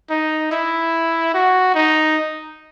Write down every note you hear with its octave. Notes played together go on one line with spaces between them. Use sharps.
D#4
E4
F#4
D#4